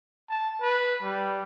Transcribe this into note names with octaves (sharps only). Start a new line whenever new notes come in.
A5
B4
G3